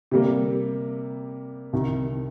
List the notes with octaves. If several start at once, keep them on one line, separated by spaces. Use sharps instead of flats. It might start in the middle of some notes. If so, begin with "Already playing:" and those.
C3 G3 A#3
C2 C3 D#3